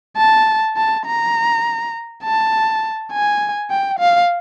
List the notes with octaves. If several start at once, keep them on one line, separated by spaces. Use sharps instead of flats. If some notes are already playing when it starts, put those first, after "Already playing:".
A5
A5
A#5
A5
G#5
G5
F5